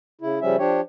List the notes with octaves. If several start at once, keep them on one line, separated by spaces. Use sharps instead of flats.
C#3 E4
C#3 F3 G3 C#4 E5
F3 D4 G4 C#5